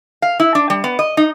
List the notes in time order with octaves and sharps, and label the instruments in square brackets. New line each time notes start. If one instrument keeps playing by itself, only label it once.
[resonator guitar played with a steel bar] F5
E4
D4
G3
B3
D#5
D#4